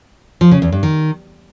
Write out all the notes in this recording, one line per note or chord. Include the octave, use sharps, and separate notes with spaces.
F3
C#3
E2
G2
D#3